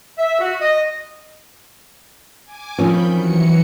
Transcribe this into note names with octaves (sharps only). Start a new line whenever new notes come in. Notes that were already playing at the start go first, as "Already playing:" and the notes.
E5
F#4
D#5
G#5 D6
D#3 F3 C4 C#4 B5 G6
E3 F#3 C#7